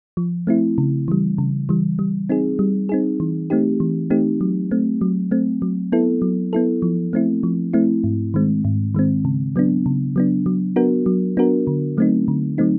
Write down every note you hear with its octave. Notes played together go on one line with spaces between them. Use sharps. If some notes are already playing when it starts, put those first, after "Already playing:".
F3
A3 C4 E4
C#3
E3 G3
C#3
E3 G3
G3
C4 D#4 G#4
G3
C4 D#4 G#4
E3
A3 C4 D#4 G4
E3
A3 C4 D#4 G4
F#3
A3 C4
F#3
A3 C4
F#3
B3 E4 A4
F#3
B3 E4 A4
F3
A3 C4 E4
F3
A3 C4 E4
G#2
D#3 G#3 C4
G#2
D#3 G#3 C4
C#3
F#3 B3 D4
C#3
F#3 B3 D4
F#3
B3 D4 F#4 A#4
F#3
B3 D4 F#4 A#4
D3
F#3 A3 C4 D#4
D3
F#3 A3 C4 D#4